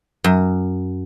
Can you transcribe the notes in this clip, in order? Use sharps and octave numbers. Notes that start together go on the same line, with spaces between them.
F#2